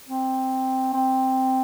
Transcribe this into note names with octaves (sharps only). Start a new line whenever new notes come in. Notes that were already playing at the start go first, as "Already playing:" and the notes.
C4
C4